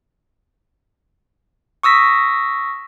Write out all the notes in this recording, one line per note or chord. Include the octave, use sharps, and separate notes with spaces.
C#6 D#6 E6 A#6 B6